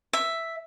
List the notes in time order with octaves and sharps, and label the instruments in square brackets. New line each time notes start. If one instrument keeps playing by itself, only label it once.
[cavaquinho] E5